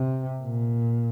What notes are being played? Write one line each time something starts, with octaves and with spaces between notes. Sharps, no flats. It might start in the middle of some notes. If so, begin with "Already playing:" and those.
Already playing: C3
A#2